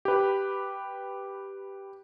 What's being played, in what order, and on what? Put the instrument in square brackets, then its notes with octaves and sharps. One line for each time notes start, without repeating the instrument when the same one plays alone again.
[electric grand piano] G4 B4